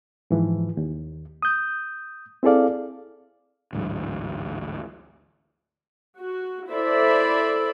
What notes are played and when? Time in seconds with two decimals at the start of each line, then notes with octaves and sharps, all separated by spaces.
0.31 G#2 E3 F3
0.77 D#2
1.43 D#6 G6
2.43 C4 E4 G#4 A4 D5 F5
3.73 A1 D2 G#2 F#3
6.18 F#4
6.71 E4 A4 C5 D5 E5 B5